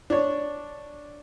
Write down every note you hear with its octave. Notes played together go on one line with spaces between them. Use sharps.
D4 C#5